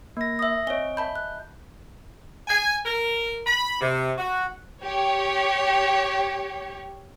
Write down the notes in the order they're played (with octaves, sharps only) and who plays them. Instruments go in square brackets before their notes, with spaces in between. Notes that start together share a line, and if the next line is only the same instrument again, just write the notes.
[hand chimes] A#3 A#6
[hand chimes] E5 A#6 [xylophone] D#6 E6
[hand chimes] C4 C#5 [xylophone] D#5 G#5 G7
[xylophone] E5 A5 B5 [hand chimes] G6
[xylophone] F#6
[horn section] G#5
A#4
B5
C3
F#4
[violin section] G4 C#5